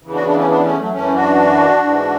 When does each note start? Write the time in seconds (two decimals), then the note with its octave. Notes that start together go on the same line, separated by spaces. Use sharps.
0.03 E2 C#3 E3
0.14 D4 F#4
0.25 B3 D4
0.37 A3 C#4
0.47 B3 D4
0.63 A3 C#4
0.78 F#3 A3
0.93 F#2 E3 A3 C#4
1.15 D4 F#4
1.83 G#2 E3